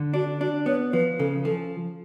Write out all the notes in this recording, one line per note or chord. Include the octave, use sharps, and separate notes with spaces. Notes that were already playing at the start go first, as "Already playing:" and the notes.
Already playing: D3
D4 F#4
D4 F#4
B3 C#5
F3 B4
C#3 A4
F3 A4